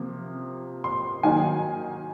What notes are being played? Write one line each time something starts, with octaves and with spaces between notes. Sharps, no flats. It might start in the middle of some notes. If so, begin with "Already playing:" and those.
Already playing: C3 F3 A#3
C6
D#3 F#3 A#3 D#4 G#5